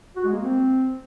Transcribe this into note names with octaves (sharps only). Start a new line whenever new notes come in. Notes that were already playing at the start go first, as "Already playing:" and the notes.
F#4
G#3
A#3
C4